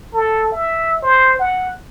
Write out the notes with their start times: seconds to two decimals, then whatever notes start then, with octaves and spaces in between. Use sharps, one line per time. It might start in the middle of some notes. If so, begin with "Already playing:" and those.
0.14 A4
0.52 E5
1.03 C5
1.39 F#5